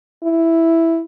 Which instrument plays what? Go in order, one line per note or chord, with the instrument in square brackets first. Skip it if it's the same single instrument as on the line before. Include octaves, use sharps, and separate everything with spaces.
[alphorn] E4